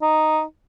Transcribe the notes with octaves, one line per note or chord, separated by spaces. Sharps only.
D#4